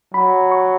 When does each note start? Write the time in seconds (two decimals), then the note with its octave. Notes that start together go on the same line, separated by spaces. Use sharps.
0.14 F#3 B5
0.52 C#6